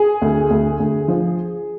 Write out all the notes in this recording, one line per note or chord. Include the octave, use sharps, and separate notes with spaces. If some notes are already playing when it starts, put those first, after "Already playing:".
Already playing: G#4
D2
D2
D2
F3